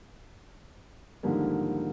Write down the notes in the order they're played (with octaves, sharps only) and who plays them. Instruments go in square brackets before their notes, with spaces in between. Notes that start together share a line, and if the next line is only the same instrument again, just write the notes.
[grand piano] G#2 D3 D#3 F3 G3 A#3